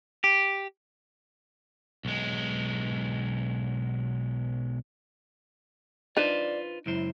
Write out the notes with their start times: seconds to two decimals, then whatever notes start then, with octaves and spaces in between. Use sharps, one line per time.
0.24 G4
2.05 B1 G#3
6.17 D4 D#4 F4 B4 C5 D5
6.86 C#2 F#2 E4 C5